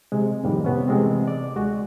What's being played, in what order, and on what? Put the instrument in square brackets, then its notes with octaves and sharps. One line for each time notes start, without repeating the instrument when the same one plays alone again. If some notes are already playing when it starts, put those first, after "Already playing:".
[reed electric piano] C3 G#3
F2 A2 D#3 G3 A#3
C3 B3 C#4
C3 E3 G#3 A3 C4
D5
D2 G#3 F#4